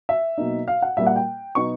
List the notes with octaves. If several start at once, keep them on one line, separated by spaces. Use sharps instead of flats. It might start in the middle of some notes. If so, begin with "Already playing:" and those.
E5
B2 F#3 A#3 D#4
F5
F#5
A#2 G3 A#3 E5
F#5
G5
B2 F#3 B3 D#4 C#6